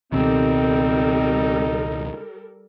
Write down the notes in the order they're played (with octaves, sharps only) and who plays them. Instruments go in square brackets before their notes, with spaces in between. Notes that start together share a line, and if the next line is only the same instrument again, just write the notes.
[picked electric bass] C#2 B2 D#3 [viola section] G3 A4 A#4 [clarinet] C4 [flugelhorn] D#4